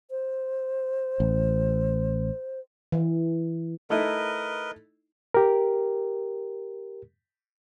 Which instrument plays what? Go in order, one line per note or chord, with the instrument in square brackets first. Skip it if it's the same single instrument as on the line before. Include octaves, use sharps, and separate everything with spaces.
[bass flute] C5
[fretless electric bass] A1
[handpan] E3
[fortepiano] A3 D#4 E4 [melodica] A#4 B4 D#5
[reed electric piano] G4 A#4